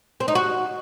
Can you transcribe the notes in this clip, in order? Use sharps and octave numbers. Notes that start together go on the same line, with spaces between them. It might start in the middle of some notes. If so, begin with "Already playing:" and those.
C4
D#4
F#4